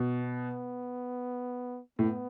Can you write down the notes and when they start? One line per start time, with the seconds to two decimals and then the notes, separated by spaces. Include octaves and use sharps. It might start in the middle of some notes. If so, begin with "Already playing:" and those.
Already playing: B2
0.24 B3
1.99 A2 B3